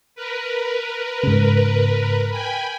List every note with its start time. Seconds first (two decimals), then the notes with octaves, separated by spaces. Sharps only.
0.15 A#4 B4
1.23 G#2 C#3
2.30 G5 G#5 B5